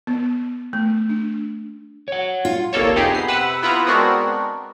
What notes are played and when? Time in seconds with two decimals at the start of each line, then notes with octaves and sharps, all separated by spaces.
0.07 B3
0.73 A3
1.09 D4
2.08 C#5 F#5
2.45 F4
2.73 G1 C2 A#3 A4 C#5
2.95 F2 C3 D#4 G4 G#4
3.11 B3 C7
3.28 C3 B4 F#5 E6
3.62 B3 E4 F4 B4 F#5 A#5
3.86 G#3 B3 C4 D4 F#4 A#4